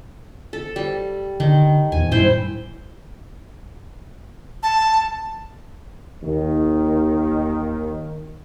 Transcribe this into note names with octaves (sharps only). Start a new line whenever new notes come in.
A4
G3
D3 D#3
D#1 E2 G#5
F#2 A2 G3 E4 C5 G5
A5
D#2 D#3